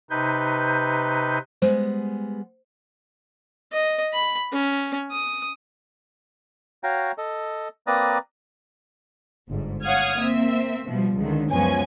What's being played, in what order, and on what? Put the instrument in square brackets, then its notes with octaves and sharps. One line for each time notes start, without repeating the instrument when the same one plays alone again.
[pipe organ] C3 D#4 B4 G6
[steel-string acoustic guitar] G3 G#3 B3 [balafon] C5
[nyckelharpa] D#5
B5
C#4
D#6
[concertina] F#4 C#5 F5 G5 A#5
A4 D#5
A#3 C4 B4 D5 A#5 D#6
[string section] G1 G#2
C#5 F5 F#5 D#6 F6 G#6
A#3 C4 E5
B2 F3 G3
C#2 D3 D#3
C#2 F#2 F3 B3 C#4 G#5